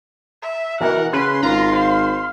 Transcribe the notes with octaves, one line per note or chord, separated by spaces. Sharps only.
E5
B2 E3 A#4 F#5
C#3 C#4 B4 C6
G#1 F4 A#5
C5 F5